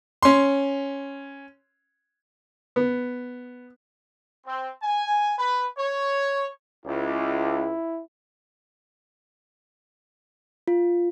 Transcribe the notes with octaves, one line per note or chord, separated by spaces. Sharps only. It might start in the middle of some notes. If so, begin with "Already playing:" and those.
C#4 C6
B3
C4
G#5
B4
C#5
C#2 E4
F4